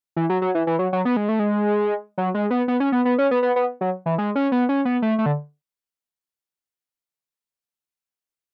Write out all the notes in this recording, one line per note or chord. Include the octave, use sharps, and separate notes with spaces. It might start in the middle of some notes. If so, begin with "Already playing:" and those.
E3
F#3
F#3
E3
E3
F#3
F#3
B3
G#3
A3
G#3
F#3
G#3
B3
B3
C#4
B3
B3
C#4
B3
B3
B3
F#3
E3
G#3
C#4
B3
C#4
B3
A3
A3
D3